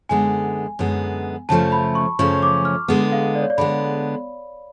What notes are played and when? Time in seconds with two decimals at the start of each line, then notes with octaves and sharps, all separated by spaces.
0.09 F#2 D3 G#3 B3 G#5
0.79 F#2 D3 G#3 B3
1.49 F#2 C#3 F3 A3 C#4 A5
1.72 B5
1.95 C#6
2.19 F#2 C#3 F3 A3 C#4 C#6
2.43 D6
2.65 F6
2.88 D3 G#3 B3
3.12 F5
3.35 D5
3.42 C#5
3.50 D5
3.58 D3 G#3 B3 B5